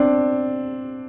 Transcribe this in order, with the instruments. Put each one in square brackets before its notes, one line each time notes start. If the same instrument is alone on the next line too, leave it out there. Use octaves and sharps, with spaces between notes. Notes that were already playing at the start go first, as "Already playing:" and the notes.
Already playing: [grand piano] C4 D4